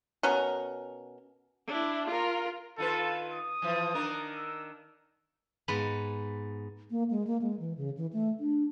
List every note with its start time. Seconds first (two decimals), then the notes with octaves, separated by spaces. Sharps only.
0.23 B2 C#4 A#4
1.67 D4 E4
2.07 F4 A#4
2.78 D#3 F4 A4 B4
3.31 D#6
3.62 E3 F3
3.94 D#3 D4 A#4
4.36 E6
5.68 G#2 B3 B4 B5
6.91 A#3
7.11 G#3
7.27 A#3
7.42 G#3
7.60 E3
7.77 C#3
7.97 E3
8.13 A3
8.40 D4